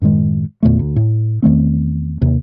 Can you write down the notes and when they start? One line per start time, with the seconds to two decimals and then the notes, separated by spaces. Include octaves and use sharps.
0.02 F#2 A2 D#3 G#3
0.63 E2 A#2 D3 A3
0.79 D2
0.96 A2
1.42 E2 D#3 A3 C4
2.21 D#2 C3